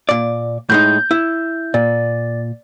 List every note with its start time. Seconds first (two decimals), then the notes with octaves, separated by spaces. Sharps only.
0.09 A#2 D5
0.70 A2 G#3 D#4 G6
1.11 E4
1.74 A#2 D5